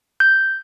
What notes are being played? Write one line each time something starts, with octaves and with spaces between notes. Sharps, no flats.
G6